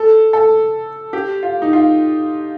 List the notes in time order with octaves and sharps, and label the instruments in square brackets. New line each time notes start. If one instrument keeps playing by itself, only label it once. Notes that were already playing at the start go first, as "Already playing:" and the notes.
Already playing: [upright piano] A4
A4
G4
F4
D#4
F4